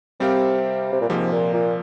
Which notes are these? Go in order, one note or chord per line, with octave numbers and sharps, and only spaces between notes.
C3 G3 C4 G4 A#4 F5
C3
A#2
G#2 C3 F3 A#3
A#2
A#2